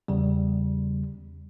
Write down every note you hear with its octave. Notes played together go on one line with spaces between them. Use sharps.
E2 C#3 G3